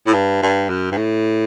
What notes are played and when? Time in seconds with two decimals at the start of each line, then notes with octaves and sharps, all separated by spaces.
0.06 A2
0.13 G2
0.42 G2
0.69 F#2
0.91 G2
0.97 A2